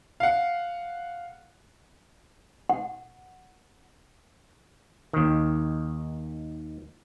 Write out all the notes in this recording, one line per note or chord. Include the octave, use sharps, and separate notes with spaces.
F5 F#5
F#5
D#2 D#3